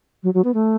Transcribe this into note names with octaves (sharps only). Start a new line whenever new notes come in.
F#3
F#3
B3
A3